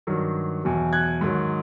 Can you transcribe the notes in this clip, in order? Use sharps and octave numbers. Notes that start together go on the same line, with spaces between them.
G2 D#3 F#3
E2 B2 F#3
F#6 G#6
G#2 D#3 F#3